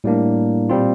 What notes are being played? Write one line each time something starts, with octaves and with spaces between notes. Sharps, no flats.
A2 G3 A#3 D4
A#2 G3 C4 F4